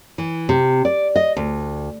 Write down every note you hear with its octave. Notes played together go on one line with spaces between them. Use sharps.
E3
C3
D5
D#5
D2